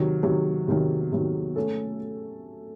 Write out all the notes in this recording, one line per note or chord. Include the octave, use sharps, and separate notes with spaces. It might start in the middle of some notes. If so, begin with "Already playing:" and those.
Already playing: C3 D#3 F#3
C3 D#3 F#3
C3 D#3 F#3
C3 D#3 F#3
A3 C#4 A4